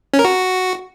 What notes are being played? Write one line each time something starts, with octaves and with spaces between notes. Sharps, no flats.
C#4
A#4
F#4